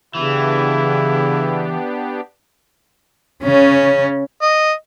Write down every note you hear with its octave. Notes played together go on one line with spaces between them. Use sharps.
C#3 E3 B3 D4 E4 G4
C#3 C#4
D#5